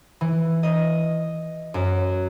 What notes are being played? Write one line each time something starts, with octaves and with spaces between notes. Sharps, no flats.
E3
D#5
F#2